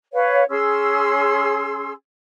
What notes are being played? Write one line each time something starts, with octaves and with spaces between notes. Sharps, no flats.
B4 C#5 F5
C#4 G#4 C6 E6